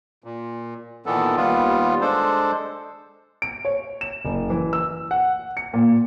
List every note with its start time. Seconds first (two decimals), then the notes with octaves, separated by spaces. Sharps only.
0.24 A#2
1.06 A#2 D#3 E3 B3 A4
1.37 D#2 G3 B3 F4
2.01 G#3 D4 A4 C5
3.42 D7
3.65 C#5
4.01 E7
4.25 F#1
4.50 E3
4.73 E6
5.11 F#5
5.57 C#7
5.74 A#2